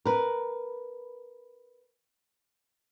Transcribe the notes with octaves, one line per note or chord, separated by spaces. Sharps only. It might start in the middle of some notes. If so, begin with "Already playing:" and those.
A#4 B4